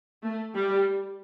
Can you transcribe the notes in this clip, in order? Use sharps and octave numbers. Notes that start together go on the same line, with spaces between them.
A3
G3